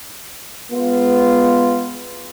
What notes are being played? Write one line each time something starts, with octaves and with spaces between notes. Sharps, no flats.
G#3 B3 F4